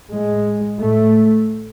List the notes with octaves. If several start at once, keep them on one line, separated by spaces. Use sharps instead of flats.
A2 G#3
A2 A3